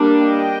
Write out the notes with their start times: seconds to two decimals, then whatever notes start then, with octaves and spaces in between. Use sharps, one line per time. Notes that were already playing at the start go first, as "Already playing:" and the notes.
Already playing: G3 A#3 D4
0.23 D#5 G5